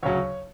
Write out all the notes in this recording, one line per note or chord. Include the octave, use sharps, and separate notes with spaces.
D2 C#3 F#3 C#5